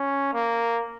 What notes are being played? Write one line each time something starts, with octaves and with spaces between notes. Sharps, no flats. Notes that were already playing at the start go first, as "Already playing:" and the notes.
Already playing: C#4
A#3